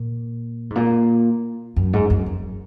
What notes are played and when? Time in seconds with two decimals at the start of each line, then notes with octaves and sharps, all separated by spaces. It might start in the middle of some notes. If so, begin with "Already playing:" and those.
Already playing: A#2
0.70 G#2
0.76 A#2
1.76 F#2
1.93 G#2
2.10 F#2
2.26 F#2